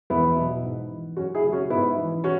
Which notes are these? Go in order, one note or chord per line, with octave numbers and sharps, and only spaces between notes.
E2 B3 E4
B2 F#3
G#2
E3
F#2 C#4 F#4
E4 G#4
C#3 F#3
C#4 F#4
G#2 B3 E4
E3
C#4 F#4